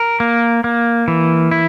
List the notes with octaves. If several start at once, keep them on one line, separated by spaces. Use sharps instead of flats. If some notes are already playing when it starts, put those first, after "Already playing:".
Already playing: A#4
A#3
A#3
E3
E4